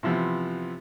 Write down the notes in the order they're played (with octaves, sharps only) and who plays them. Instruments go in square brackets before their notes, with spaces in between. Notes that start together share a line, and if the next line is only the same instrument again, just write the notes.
[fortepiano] C3 E3 F3 B3